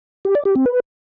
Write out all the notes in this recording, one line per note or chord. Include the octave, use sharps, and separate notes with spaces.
G4
D5
G4
C4
B4